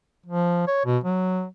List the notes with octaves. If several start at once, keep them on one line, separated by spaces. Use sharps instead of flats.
F3
C#5
B2
F#3